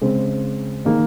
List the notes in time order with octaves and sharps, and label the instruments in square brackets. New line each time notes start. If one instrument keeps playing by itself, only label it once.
[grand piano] C#3 G#3 C4
D#3 A#3 D#4 G#4